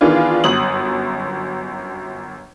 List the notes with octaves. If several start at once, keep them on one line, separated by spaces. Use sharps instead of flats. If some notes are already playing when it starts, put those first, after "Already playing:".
D#3 E3 B3 D4 F4 G#4
G1 F#2 D#6 F#7